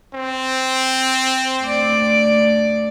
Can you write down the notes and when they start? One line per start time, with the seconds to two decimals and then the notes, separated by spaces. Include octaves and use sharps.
0.14 C4
1.63 D2 D5